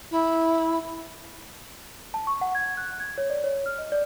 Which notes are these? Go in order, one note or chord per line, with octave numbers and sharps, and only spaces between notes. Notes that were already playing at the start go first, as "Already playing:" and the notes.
E4
A5
C#6
F#5
G#6
F#6
G#6
C#5
D5
C#5
F6
D#5
D5